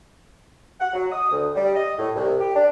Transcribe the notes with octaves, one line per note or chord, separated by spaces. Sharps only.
F#5
F#3
D#6
D2
G3
D#5
A2
C2
G4
D4